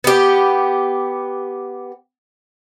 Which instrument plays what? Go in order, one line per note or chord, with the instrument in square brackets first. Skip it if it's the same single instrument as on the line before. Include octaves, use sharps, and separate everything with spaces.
[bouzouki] B3 G4